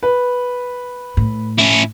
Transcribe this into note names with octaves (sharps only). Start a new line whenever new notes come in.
B4
A2
C#4 E4